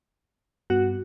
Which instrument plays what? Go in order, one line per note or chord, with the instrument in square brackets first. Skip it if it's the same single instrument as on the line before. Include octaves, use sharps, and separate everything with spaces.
[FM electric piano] G2 B3 [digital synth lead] F#4